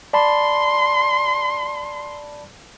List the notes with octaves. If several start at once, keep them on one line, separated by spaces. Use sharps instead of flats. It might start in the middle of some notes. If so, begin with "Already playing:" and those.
D5 A5 B5 C6